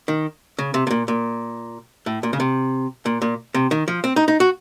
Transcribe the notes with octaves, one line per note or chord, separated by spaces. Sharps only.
D#3
C#3
C3
C3
A#2
A#2
A2
A#2
C#3
C3
A#2
A#2
C3
D#3
F3
C4
D#4
D#4
F#4